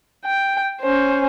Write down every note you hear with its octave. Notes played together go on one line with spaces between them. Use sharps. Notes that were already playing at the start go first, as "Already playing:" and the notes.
G5
C#4 C5